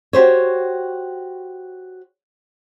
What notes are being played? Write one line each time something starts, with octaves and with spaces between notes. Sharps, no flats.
F#4 G4 C5 C#5